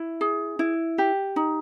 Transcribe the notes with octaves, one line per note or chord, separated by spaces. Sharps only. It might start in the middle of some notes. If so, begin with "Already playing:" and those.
Already playing: E4
G#4
E4
G4
D#4